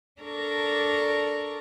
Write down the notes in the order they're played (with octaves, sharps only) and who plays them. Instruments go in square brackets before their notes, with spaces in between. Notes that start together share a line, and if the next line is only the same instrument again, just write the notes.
[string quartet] D4 A4 A#4 D5 A#5 C#6